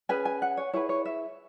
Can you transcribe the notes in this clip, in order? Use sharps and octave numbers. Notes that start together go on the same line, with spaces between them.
C#4 G#4 B4 G#5
G#5
F#5
C#5
E4 G#4 B4 C#5
C#5
E5